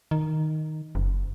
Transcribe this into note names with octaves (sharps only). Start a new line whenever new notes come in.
D#3
F#1